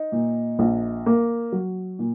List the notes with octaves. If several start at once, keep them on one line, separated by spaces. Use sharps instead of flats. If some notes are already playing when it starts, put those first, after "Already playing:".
Already playing: D#4
A#2
A#1
A#3
F#3
A#2